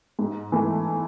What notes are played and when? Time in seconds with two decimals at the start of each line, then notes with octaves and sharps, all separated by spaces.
0.19 G#2
0.52 E3 A3